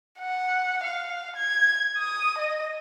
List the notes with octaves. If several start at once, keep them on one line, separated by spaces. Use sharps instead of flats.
F#5
F5
G#6
D#6
D#5